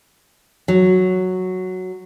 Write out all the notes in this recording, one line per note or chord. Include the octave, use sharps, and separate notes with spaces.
F#3